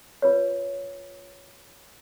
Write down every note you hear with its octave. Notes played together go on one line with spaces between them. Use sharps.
F4 B4 C#5